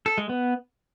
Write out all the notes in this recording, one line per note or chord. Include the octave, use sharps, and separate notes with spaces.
A4
G#3
B3